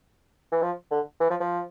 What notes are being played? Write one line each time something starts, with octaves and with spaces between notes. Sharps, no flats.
E3
F3
D3
E3
F3
F3